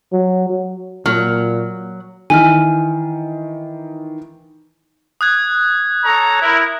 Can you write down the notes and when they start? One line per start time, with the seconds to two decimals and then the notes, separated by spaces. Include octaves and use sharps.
0.13 F#3
0.50 F#3
1.06 A#2 F#3 F6
2.30 D#3 E3 G#5 F6
5.21 D#6 F#6 G#6
6.04 A4 C#5 A#5
6.41 E4 A#4